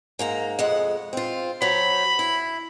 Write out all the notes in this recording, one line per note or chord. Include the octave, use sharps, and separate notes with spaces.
G#2 A#3 A#5
F2 G#3 F#5
C4 F4
F#3 C5 B5
E4